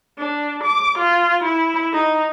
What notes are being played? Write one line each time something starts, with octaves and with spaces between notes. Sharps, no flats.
D4
D6
F4
E4
D#4